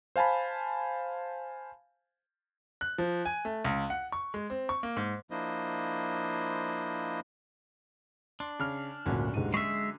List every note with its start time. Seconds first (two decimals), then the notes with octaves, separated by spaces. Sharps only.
0.16 C5 F5 G#5 A5 B5
2.81 F#6
2.98 F3
3.25 G#5
3.45 A3
3.65 C#2
3.90 F#5
4.12 C#6
4.34 G#3
4.50 C4
4.69 C#6
4.83 A#3
4.96 G#2
5.31 F3 A#3 D4 E4 C5 D#5
8.40 D4 C6
8.59 C#3 F6
9.06 G#1 D2 A#2 D3 F#3 C#4
9.34 D#1 G#2 D#7
9.54 G#3 E5 C#6 C7